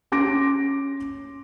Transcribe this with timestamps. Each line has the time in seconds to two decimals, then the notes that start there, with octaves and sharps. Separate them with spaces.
0.12 C#4 C6 D6 A#6 D7